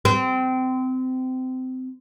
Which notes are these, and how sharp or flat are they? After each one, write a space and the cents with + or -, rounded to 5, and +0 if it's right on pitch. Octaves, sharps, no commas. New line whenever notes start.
C4 -25